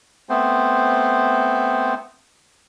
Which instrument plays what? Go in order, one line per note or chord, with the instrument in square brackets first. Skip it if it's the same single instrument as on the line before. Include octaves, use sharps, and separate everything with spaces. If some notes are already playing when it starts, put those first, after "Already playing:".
[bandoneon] A3 B3 C4 C5